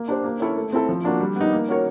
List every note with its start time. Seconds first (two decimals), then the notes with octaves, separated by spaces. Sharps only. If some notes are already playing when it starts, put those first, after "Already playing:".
Already playing: A#3
0.08 D4 G4 C5
0.24 A#3
0.40 C#4 E4 A4 C#5
0.56 A3
0.73 C4 E4 A4
0.89 F3
1.04 A#3 D4 F#4
1.20 G3
1.36 B3 D#4
1.53 A#3
1.68 C#4 F#4 A#4 C#5